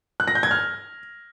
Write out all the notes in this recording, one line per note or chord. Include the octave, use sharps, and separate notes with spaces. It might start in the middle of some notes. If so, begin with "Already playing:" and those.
F#6
A#6
G6
G#6
F6